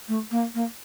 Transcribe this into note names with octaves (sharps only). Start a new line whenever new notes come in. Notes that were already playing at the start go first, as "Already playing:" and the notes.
A3
A#3
A#3